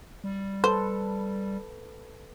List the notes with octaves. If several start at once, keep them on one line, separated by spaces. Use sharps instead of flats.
G3
A4 B4 C5